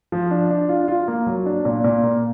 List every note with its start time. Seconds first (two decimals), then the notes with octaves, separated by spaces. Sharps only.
0.12 F3
0.31 D4
0.50 D4
0.69 F4
0.88 F4
1.08 A#3
1.27 F#3
1.46 D4
1.65 A#2
1.84 A#2
2.04 A#3